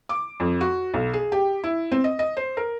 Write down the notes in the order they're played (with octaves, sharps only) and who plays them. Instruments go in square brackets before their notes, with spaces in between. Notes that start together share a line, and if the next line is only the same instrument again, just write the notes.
[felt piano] D6
F2
F#4
B1
G#4
G4
E4
C4
D#5
D#5
C5
A#4